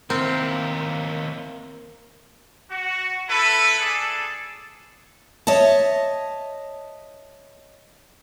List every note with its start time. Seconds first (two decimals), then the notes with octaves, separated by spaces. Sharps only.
0.10 D#2 A#3 C4 E4 A#4
2.71 F#4
3.29 E4 A4 B4
3.79 D4 G#4 A4
5.47 C#5 D#5 E5 A5